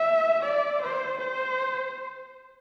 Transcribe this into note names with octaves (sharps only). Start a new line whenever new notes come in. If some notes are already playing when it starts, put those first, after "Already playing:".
Already playing: E5
D5
C5
C5